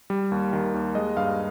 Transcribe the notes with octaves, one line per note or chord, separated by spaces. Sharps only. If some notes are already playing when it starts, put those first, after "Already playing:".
G3
D#2
D#3
D#2
G#3 D#5
G2 F5